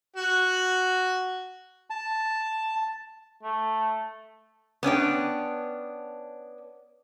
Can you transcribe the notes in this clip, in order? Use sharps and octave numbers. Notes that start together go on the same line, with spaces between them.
F#4
A5
A3
B3 C#4 D4 G5